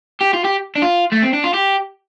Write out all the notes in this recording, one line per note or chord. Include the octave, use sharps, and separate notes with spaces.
G4
F4
G4
D4
F4
A3
C4
D4
F4
G4